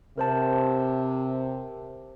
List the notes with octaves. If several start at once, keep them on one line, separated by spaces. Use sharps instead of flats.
C3 A#4 C5 A5